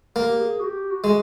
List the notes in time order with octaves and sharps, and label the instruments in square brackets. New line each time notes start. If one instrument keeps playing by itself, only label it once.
[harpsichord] A#3 [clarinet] G4
[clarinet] G#4
F#4
G4
F#4
[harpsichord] G#3